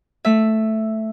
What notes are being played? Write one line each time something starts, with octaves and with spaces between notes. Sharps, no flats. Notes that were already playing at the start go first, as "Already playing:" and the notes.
A3 E5